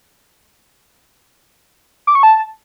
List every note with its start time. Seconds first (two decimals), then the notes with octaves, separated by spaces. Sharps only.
2.07 D6
2.15 C#6
2.23 A5